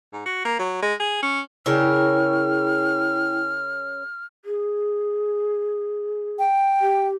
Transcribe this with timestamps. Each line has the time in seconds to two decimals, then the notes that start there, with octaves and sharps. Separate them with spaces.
0.13 G#2
0.26 F#4
0.45 A#3
0.59 F#3
0.82 G#3
1.00 G#4
1.23 C#4
1.66 C#3 E4 A#4 C#5 G5 F6
4.45 G#4
6.39 G5
6.81 G4